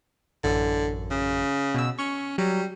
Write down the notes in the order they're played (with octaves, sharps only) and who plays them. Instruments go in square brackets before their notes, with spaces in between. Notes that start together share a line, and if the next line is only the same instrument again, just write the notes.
[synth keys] A1 F#2 [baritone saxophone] D3
[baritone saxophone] C#3
[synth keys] B2 E6
[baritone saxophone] C#4 [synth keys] C#6
[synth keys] F#3 [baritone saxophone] G3